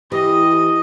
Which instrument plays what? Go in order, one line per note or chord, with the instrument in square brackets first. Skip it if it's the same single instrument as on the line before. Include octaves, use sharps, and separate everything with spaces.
[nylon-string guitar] E3 [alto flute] G4 [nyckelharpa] D#5